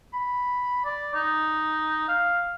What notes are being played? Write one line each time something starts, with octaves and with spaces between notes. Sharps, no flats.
B5
D5
D#4
F5